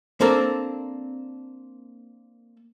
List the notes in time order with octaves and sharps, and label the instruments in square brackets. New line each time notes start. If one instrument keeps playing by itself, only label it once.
[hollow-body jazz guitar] A#3 C4 D4 A4 A#4